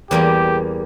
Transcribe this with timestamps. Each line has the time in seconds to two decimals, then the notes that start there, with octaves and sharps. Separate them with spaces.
0.11 E2 G3 A#3 G4